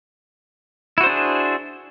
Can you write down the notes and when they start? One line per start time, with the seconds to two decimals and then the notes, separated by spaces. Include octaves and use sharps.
0.98 E4
1.01 F#4
1.03 C5
1.06 D4
1.09 G#4